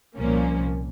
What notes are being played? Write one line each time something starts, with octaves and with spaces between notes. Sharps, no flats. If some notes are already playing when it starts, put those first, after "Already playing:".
C2 A#2 F3 A#3 C#4